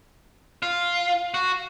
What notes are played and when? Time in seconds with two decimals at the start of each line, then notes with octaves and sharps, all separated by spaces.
0.63 F4
1.34 F#4